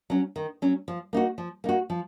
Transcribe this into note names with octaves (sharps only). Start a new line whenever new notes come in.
F#3 C#4
D#3
F#3 C#4
F3
A#3 D#4 F#4
F3
A#3 D#4 F#4
F3